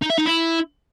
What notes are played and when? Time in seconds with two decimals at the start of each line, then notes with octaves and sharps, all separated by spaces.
0.02 D#4
0.10 E5
0.18 D#4
0.26 E4